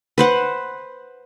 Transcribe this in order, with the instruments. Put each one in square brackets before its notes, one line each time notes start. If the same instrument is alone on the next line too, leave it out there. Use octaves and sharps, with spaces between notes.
[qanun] B4 C5 F#5